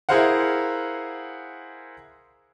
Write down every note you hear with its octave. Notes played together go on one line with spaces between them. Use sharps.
E4 G#4 A#4 C5 F5 F#5